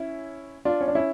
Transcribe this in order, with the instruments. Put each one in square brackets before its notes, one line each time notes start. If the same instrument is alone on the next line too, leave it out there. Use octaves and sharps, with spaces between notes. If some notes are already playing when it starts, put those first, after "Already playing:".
Already playing: [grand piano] C#4 E4
D4 F4
C#4
D4
C#4 E4